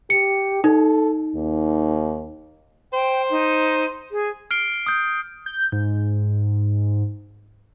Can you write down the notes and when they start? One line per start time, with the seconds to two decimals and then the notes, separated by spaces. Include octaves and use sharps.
0.10 G4 C#7
0.64 D#4 A4
1.35 D#2
2.93 C5 G5
3.30 D#4
4.12 G#4
4.51 F6 C7 D7 G7
4.86 D#6 G6
5.46 G6
5.72 G#2